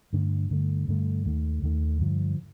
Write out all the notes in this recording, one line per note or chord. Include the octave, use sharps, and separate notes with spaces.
G2 D3 A3 D4
G2 D3 A3
G2 D3 A3
D#2 D#3 A3
D#2 D#3 A3
G2 D3 F3